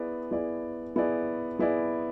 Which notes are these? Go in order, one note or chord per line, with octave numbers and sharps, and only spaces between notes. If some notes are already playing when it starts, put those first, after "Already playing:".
Already playing: B3 E4 G#4 D5
B3 E4 G#4 D5
B3 E4 G#4 D5
B3 E4 G#4 D5